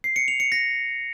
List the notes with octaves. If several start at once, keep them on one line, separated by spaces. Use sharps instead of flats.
C7
C#7
F7
C#7
A#6